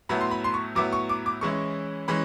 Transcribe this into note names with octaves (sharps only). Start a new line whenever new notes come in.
A2 F#3 B3 E4 B5
C6
B5
C6
C#6
A2 F#3 B3 E4 D6
C#6
D6
D6
E3 G#3 C#4 E4 C#6
E3 G#3 C#4 B5